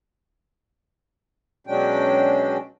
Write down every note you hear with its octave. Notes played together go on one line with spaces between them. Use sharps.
B2 F#3 G#3 C#4 D4 G5